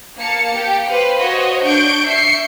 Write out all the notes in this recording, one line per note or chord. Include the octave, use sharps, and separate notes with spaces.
A#3 F5 A5 C#7
G4
B4 C5 F5
F#4 C5 C#5 D#5
D4 C#6 G6 D7
E5 C7 C#7